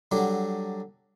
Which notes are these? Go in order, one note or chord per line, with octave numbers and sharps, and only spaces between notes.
D3 F#3 G3 D4